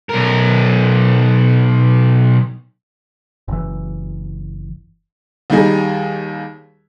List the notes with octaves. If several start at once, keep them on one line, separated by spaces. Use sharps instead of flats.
B1 A#4
F#1 E3
D#2 G3 D#4 G#4